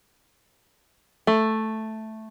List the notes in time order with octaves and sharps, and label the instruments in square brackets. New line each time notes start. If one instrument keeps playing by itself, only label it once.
[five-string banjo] A3